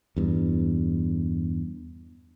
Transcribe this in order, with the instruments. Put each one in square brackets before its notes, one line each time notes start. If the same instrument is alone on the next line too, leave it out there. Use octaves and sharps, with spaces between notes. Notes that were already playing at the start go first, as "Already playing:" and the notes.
[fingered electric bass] E2 G2